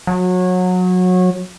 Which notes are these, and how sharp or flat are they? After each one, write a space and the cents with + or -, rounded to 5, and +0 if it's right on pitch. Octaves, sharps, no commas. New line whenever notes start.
F#3 -25